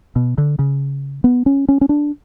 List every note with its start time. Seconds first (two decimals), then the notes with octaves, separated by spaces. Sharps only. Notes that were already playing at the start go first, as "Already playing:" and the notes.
0.16 B2
0.38 D3
0.59 C#3
1.24 B3
1.46 C#4
1.69 C#4
1.81 C#4
1.89 D4